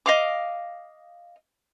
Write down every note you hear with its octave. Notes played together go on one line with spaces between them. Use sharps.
D#5 F5 D6